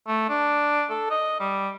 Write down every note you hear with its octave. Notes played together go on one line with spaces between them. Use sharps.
A3
D4
A4
D#5
G3